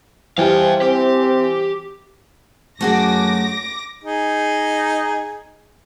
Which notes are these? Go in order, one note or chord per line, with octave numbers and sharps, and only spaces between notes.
E3 G3 C5 F5 G5
C4 G4
F#2 A3 F#4 G#4 D6 A#6
D#4 G#4